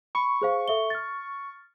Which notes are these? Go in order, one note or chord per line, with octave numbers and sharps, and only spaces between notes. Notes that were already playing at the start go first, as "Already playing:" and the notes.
B5 C#6
G#4 C5 F5
A4 E5 G7
F6 A6